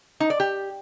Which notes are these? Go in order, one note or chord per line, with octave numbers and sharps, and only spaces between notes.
D#4
D5
G4